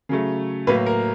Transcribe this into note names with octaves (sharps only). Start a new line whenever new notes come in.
C#3 F#3 A3
A2 F#3 A#3 B4
A#4